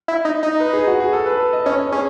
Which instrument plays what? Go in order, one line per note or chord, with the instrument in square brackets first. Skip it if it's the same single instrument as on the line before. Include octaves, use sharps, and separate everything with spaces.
[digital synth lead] E4
D#4
D#4
[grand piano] B4
G#4
F#4
G#4
A4
B4
A4
D#5
[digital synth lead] C#4 [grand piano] D#5
[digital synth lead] C#4 [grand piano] G#4